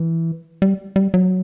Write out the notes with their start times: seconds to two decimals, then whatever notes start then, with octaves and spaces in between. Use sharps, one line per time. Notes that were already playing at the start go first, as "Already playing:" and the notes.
Already playing: E3
0.62 G3
0.96 G3
1.14 F#3